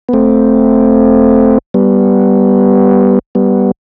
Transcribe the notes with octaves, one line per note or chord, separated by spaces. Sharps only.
B3
A3 C4
G3 B3
G3 B3